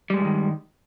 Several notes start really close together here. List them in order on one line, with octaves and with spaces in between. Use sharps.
G3 G#3 G2 E3 D#3